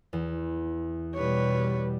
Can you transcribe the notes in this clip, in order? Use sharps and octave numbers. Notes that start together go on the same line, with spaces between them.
E2
B2 G3 B4 C#5